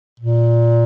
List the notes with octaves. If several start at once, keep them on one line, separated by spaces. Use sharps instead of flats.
A#2